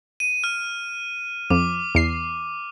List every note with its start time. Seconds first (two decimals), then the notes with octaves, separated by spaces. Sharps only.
0.20 D#7
0.44 F6
1.50 F2 D6
1.95 E2 C7